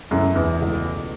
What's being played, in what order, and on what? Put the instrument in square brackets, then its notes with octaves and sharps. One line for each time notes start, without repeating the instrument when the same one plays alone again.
[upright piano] C#2 B2 A3 E4 A4 [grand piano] F#2
[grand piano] E2
[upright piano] C#2 B2 A3 E4 A4